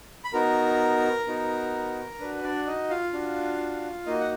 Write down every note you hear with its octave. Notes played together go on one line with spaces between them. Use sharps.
B5
B3 D#4 F#4 A#4 A#5
B3 D#4 F#4
D4 F#4 B4
D4 D5
D#4 D#5
F4 F5
D4 F#4
A#3 D#4 F#4 D#5
F#5